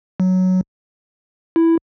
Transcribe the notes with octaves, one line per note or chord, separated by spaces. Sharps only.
F#3
E4